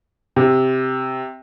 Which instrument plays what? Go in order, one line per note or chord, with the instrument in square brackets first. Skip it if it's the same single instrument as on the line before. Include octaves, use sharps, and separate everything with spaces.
[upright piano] C3